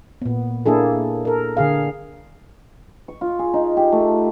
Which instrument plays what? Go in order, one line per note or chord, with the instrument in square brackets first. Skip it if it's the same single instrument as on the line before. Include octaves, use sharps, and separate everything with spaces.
[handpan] A#2 B3
A#3 D4 E4 G#4 A4
A4 A#4
D3 G#4 F5
[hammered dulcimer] C#6
F4
G#4
D#4
G4
A3